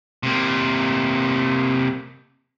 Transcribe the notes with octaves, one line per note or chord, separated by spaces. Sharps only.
C3 A#3